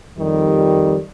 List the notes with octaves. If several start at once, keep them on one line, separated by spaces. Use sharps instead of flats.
F2 D#3 G3